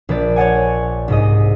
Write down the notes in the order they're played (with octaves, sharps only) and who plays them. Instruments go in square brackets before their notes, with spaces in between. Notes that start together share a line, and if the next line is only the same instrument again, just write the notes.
[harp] A#1 B4 D5
C#5 D5 F#5 G#5
C2 G#2 D#5